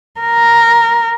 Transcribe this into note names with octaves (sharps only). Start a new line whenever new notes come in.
A#4